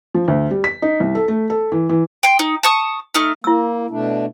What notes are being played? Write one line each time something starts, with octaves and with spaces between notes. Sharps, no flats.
F3
D2
G3
B6
D#4
C2
A4
A3
A4
E3
E3
G5 C6
D#4
A5 C#6 D#6
A3 D#4 F6
A#3 E4 E6
B2 A3 D4